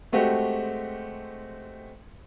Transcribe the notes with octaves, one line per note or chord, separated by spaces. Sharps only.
G#3 A3 C4 F#4 G4